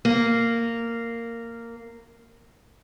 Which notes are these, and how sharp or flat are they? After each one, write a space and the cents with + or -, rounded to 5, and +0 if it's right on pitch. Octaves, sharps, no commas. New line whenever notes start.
A#3 -10